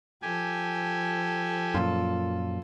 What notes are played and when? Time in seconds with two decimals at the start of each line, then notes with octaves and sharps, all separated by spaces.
0.22 F3 G4 A4 G#5
1.74 F#2 A#2 F4